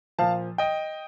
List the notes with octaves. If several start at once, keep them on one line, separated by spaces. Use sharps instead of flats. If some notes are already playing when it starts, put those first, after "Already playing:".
A#2 F3 F5 A5
D#5 G5